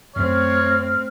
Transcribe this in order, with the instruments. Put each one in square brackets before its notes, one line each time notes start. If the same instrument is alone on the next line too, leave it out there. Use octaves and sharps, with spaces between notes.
[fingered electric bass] F#2 C#4 [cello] A3 C4 [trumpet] C#5 [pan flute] F6